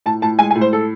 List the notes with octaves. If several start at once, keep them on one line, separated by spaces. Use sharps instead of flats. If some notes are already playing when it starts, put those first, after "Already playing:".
A2 A5
A2 A5
G#3 G#5
G#5
A2
C5
A4